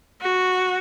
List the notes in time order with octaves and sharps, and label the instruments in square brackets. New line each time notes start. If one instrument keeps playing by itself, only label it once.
[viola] F#4